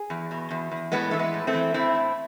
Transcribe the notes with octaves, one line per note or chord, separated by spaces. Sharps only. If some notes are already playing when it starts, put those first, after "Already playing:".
Already playing: G#4
E2
B2
E2
E2
A2 G#3 B3
E3 A3
G#3 B3
A2
A3 C4
E3
A2 C4 E4
A2